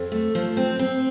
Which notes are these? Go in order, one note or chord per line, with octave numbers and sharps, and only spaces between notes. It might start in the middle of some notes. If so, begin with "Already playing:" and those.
Already playing: F2
A3
F3
C4
C4